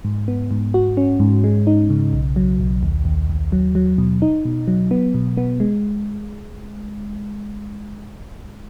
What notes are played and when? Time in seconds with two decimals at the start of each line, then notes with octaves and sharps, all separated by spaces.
0.05 G#2
0.28 B3
0.51 G#2
0.74 F#4
0.97 C#4
1.20 G#2
1.44 G#3
1.67 D#4
1.90 C#3
2.13 B1
2.36 F#3
2.60 B1
2.83 D#2
3.05 D#2
3.29 D#2
3.52 F#3
3.75 F#3
3.98 B2
4.22 D#4
4.45 B2
4.68 F#3
4.91 B3
5.14 B2
5.37 B3
5.60 G#3